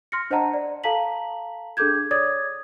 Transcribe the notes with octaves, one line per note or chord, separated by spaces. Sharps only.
C6 F6 A#6 C#7
D4 C5 D#5 F#5 A5 A#5
D5
A4 F5 A5 A#5 B6 F#7
D4 G#4 A4 D6 G6 G#6
C#5 D5 D6 D#6 G#6 A6